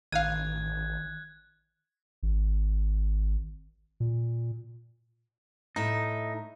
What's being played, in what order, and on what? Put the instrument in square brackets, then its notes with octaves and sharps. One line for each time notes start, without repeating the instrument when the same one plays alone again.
[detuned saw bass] A1 [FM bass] D#3 [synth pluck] F5 D#7 [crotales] F#6 G#6
[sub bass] G#1
A#2
[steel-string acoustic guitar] A2 E5 [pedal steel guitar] D#4